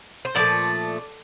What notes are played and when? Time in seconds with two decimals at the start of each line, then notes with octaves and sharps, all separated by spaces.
0.25 C5
0.35 A#2 F3 A3 D5